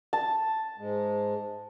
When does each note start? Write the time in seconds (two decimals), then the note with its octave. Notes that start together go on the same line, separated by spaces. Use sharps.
0.13 A5
0.78 G#2 G#3